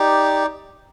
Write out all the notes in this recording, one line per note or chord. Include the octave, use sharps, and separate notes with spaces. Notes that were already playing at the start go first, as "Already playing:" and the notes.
Already playing: D#4 G4 D5